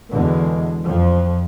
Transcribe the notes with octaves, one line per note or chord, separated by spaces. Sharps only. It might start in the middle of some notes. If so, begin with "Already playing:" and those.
E2 B2 D3 G#3
F2 F3